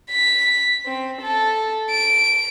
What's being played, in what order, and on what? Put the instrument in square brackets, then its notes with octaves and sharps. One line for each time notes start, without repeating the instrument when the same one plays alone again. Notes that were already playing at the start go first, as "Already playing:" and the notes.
[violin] B6
C4
A4
D7